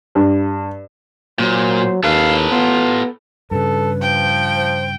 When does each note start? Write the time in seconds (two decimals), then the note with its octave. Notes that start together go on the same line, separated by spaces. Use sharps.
0.15 G2
1.39 A#2 F#3 C5
2.04 D#2 A4 B4 F5
2.51 B3 F4
3.51 G2 C#3 A4 B4
4.02 F3 G5
4.55 C5